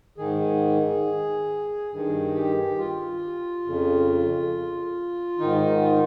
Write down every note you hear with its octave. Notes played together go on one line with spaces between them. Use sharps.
G#2 D#3 G#4
G2 D#3 G#4
G4
F4
F2 C#3
G#2 D#3 D#4
F4